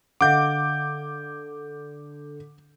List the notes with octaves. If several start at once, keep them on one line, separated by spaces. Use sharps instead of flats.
D3 D#5 F5 F#5 D6 G6